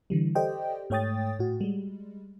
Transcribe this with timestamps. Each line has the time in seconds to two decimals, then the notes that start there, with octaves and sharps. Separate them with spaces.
0.10 D3 E3 G3
0.35 G4 A4 C5 D5 D#5 G5
0.90 G#2 A3 C#5 G5 D#6 A6
1.39 A2 F#4
1.61 G3 G#3